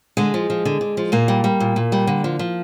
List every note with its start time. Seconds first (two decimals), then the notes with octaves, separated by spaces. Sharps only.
0.17 D3 G#3
0.34 F3
0.50 F3
0.65 D3
0.81 D3
0.97 F3
1.12 A#2 A#3
1.28 G3
1.44 G3
1.60 A#2
1.76 A#2
1.92 G3
2.07 D3
2.24 F3
2.39 F3